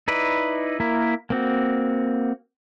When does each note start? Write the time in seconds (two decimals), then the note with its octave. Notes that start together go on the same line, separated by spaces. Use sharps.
0.08 D#4 E4 B4 D5
0.80 A#3 E4 A#4
1.30 A#3 C4 F#4